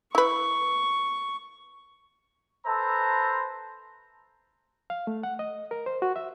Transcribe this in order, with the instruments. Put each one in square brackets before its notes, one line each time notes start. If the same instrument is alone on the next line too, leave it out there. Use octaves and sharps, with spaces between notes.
[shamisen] E4 B4 [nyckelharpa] C#6
[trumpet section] A4 B4 C5 E5 A5 A#5
[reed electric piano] F5
A3
F#5
D#5
A#4
C5
F#4
E5